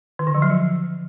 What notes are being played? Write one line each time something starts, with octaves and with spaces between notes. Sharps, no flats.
D#3
D3
F3
F#3
F3